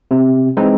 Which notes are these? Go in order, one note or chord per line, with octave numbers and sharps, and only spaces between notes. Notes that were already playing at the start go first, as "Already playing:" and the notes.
C3
E3 G#3 C4 D#4